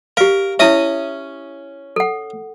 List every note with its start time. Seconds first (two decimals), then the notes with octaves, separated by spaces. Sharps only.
0.17 G4 A#4 F5
0.60 C#4 E4 E5 D#6
1.96 A4 F#5